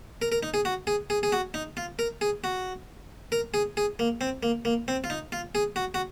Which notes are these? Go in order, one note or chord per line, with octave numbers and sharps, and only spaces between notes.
A#4
A#4
D#4
G#4
F#4
G#4
G#4
G#4
F#4
D#4
F4
A#4
G#4
F#4
A#4
G#4
G#4
A#3
C4
A#3
A#3
C4
F4
D#4
F4
G#4
F#4
F#4